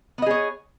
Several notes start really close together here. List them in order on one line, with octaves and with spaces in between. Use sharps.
B3 D#5 G#4 C#5